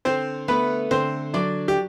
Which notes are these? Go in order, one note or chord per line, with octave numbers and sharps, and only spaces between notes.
D3 C4 C5
A3 B3 B4
D3 C4 C5
F#3 D4 D5
G4